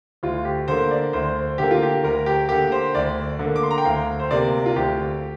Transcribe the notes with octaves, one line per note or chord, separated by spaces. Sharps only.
D2 F4
G4
D3 A#3 C5
D5
D2 C5
D3 A#3 G4
F4
G4
D2 A#4
G4
D3 A#3 G4
C5
D2 D5
D3
A#3
D6
C6
A#5
G5
D2 F5
C5
C3 A#3 D5
F4
D2 G4